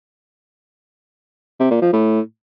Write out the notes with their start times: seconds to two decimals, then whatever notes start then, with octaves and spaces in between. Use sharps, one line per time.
1.60 C3
1.71 A#2
1.82 F3
1.93 A2